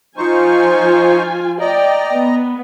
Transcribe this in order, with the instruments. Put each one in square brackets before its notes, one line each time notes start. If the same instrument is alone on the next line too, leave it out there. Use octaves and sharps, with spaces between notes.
[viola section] F3 F4 G#5 [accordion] D#4 C5 C#6
[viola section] D5 G5 [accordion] D#5 A#5
[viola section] B3